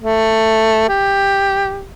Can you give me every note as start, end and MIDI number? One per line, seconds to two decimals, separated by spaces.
0.02 0.87 57
0.89 1.85 67